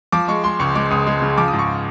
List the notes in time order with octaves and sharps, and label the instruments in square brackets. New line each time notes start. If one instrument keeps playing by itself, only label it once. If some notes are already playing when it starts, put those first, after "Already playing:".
[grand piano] F3 D6
G#3 C#6
G#3 C6
C#2 C#6
G#3 D6
C#2 D#6
G#3
C#3
F3 D6
D#6
G#2
C#6